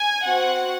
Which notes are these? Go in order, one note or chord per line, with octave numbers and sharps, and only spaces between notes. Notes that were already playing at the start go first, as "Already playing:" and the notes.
Already playing: G#5
C4 F#4 F#5